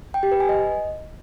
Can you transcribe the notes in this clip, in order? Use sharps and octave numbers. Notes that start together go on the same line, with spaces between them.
G5
G4
B4
G#5
D#5